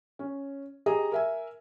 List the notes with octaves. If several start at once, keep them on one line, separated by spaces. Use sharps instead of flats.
C#4
G4 G#4 D#5 A#5
A#4 E5 G#5